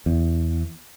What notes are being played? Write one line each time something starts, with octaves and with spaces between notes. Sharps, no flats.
E2